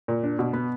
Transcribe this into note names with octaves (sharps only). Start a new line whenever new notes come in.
A#2
D4
B2
B3